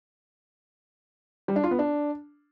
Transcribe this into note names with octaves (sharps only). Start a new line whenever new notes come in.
G3
D4
F4
B3
D4